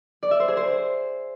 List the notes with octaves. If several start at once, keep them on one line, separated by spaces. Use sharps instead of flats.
D5
E5
C5
G#4
C5